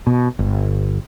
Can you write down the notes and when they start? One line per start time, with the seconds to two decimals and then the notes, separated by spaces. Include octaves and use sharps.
0.07 B2
0.39 G1